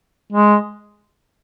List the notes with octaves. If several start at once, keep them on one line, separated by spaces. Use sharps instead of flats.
G#3